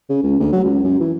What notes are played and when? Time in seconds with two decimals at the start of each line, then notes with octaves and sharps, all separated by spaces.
0.10 C#3
0.23 C#2
0.40 D2
0.52 F#3
0.64 C#2
0.84 F#2
1.00 E3